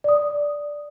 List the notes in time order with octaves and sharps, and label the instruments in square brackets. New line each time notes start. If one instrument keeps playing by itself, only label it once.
[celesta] D5 D#6